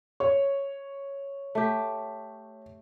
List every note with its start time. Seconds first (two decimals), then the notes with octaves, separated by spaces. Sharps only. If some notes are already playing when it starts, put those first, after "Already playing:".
0.20 C#5
1.55 A3 G4